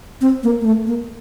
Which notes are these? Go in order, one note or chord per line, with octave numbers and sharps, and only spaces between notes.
C4
A#3
A#3
A3
A#3